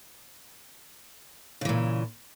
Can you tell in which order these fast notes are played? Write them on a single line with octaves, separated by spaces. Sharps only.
C#3 E3 A#2